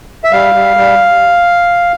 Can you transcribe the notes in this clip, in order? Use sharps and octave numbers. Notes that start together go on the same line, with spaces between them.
E5
G3 F5
G3
G3